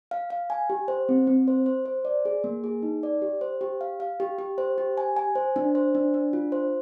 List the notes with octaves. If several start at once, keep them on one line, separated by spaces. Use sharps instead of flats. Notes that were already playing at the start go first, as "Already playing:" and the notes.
F5
F5
G#5
G4
C5
C4
C4
C5
C5
C5
D5
G#4
A#3
G#4
D#4
D5
G4
C5
G4
F5
F5
G4
G4
C5
G4
G#5
G#5
C5
D4
C5
D4
D4
F4
C5